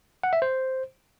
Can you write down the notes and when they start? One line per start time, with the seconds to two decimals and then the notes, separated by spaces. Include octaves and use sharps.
0.23 F#5
0.33 E5
0.42 C5